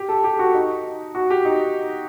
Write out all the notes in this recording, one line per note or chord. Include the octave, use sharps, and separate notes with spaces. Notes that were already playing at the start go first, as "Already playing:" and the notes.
Already playing: G4
A4
G4
F#4
D#4
F#4
G4
D#4